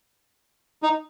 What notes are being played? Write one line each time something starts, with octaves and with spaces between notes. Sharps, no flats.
D#4